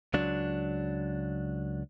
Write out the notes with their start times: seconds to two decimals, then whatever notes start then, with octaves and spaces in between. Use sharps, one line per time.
0.14 C#2 F#3 D4